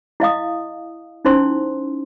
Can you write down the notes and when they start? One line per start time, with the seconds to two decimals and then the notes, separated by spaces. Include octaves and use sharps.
0.20 E4 D#5 F5 D#6
1.25 C#4 D#4 E4 C5 C6